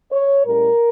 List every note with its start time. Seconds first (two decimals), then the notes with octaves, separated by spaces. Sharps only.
0.12 C#5
0.46 A2 G3 C#4 A#4